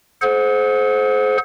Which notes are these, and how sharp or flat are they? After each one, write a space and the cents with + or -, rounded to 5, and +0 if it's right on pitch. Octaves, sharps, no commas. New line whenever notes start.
G#4 +45 C5 +0 F#5 -20